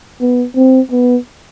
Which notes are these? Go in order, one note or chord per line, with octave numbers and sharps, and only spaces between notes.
B3
C4
B3